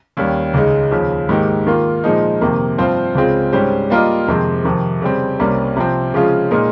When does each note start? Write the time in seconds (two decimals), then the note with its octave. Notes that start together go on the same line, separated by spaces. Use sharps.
0.17 D#2 D#3 G3 C#4
0.54 C#2 C#3 G#3 D#4
0.91 D#2 C#3 F3
1.29 G#2 D#3 A#3 D#4 G4
1.67 D#3 A#3 F4
2.04 A#2 F3 G#3 D#4
2.41 F2 C3 D#3 A#3
2.78 G2 F3 C4 F4 C5
3.15 C#2 C#3 G#3 C4 F4
3.53 G#2 G3 C#4 G4 C5
3.90 G3 A#3 F4 A#4 D#5
4.28 F2 C3 D#3 G#3 C4
4.64 F2 C3 D#3
5.02 C#3 G3 C4
5.39 C2 C3 G3 A#3 C#4
5.77 C3 F3 C4
6.14 C#3 F3 G#3 C#4 F4
6.51 A#2 G#3 D#4 A#4